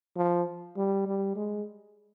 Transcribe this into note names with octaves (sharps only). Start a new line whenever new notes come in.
F3
G3
G3
G#3